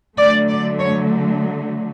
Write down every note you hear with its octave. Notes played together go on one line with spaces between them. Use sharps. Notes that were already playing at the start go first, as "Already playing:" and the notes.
D3 F#3 A3 D5
D5
C#5